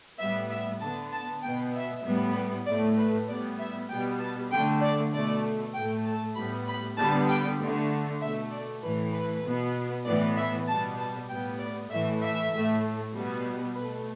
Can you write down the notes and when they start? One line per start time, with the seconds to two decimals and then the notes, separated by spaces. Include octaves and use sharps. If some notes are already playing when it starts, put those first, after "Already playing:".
0.19 A2 G3 B3 E5
0.50 E5
0.81 D3 B3 A5
1.13 A5
1.43 B2 B3 G5
1.75 E5
2.04 A2 G3 B3
2.66 A2 A3 D5
2.97 B4
3.28 A2 G3 B3 D5
3.59 E5
3.89 B2 G3 B3 G5
4.20 A5
4.51 D3 G5
4.56 A3
4.82 D5
5.13 B2 A3 D5
5.74 A2 G5
5.79 A3
6.05 A5
6.36 A2 G3 B3 B5
6.68 B5
6.97 D3 G3 B3 A5
7.29 G5
7.60 D3 A3
8.22 B2 A3 E5
8.51 D5
8.83 A2 E3 A3 B4
9.13 B4
9.44 B2 B3
10.06 A2 E3 B3 D5
10.36 E5
10.68 B2 G3 B3 A5
10.99 A5
11.29 A2 G3 B3 G5
11.59 D5
11.91 A2 E3 A3 E5
12.21 E5
12.52 A2 A3
13.14 B2 G3 B3
13.75 B2 B4
13.80 A3